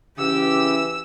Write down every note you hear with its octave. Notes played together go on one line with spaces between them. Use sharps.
C#3 E3 G4 E6